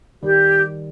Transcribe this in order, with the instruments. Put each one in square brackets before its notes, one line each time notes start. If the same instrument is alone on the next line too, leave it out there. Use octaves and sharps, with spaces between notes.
[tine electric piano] D#3 G3 [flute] G4